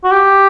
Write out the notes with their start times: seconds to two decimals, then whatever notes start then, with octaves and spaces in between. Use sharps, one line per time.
0.04 F#4
0.11 G4